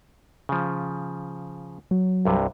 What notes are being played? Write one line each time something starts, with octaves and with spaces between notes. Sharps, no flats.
C#3 F3
F#3
C2 G2 C3